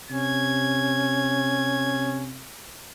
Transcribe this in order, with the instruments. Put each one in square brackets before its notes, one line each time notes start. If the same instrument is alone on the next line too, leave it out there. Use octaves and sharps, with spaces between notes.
[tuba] C3 [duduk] C#4 [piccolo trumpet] G#6